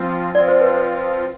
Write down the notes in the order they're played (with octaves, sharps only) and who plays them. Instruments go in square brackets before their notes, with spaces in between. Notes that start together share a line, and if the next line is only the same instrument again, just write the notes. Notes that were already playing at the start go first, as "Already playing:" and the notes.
Already playing: [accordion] F3 C4 F4
[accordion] F3 C4 F4 [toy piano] D5
[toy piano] C5
B4
C5